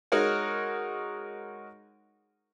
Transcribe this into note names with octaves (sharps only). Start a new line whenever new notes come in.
G#3 D#4 F#4 A#4 C#5 F#5